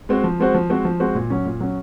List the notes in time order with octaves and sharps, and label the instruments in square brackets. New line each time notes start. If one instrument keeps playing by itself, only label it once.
[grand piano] G#3 C4 F#4 C5
F3
G#3 C4 F#4 C5
F3
G#3 C4 F#4 C5
F3
G#3 C4 F#4 C5
A#2
F#3 C#4
A#2
F#3 C#4